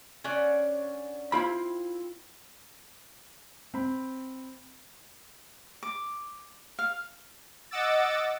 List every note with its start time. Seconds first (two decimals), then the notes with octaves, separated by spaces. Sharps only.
0.24 C#4 D4 F#5
1.32 C4 E4 F4 B5
3.74 C4 B5
5.83 D6
6.79 F5
7.71 D#5 F#5 D6 E6 A6